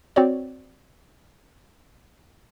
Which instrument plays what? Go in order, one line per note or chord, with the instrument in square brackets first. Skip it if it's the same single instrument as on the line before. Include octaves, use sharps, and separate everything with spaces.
[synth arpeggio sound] C4 F#4 C#5 D5